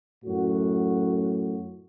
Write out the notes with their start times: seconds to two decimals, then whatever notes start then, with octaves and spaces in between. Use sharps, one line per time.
0.25 F#2 A2 F#4